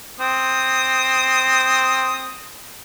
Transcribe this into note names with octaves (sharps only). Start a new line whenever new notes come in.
C4 D#6